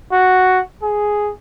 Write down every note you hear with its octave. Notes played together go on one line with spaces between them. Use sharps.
F#4
G#4